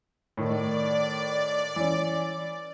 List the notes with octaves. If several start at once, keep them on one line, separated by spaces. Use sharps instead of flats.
A2 D#3 D5
E3 C#4